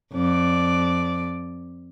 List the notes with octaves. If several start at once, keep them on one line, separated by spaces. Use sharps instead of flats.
F2 D5